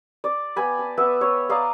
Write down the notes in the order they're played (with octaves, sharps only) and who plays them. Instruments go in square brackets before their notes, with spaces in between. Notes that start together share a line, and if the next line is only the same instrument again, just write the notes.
[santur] D5
B3 G5 G#5 B5
A5
B3 B4 E5
C#5
D5 D#5 F5 A#5